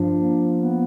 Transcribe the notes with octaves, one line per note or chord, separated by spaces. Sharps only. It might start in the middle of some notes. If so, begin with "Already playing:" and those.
Already playing: G2 F3 D4
A#3
B3